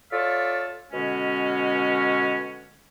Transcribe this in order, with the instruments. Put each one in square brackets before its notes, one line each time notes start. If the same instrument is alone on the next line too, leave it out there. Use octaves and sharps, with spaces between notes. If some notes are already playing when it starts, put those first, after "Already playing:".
[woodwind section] F4 A4 C#5 D5 E5 F5
B2 D3 G#3 C#4